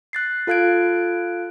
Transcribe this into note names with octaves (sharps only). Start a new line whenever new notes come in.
F#6 A6 C7
F4 A4 F5 F#6 G#6 D7